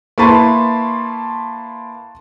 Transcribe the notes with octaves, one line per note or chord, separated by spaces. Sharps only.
A#3 E4 B4 A5 C6 C#6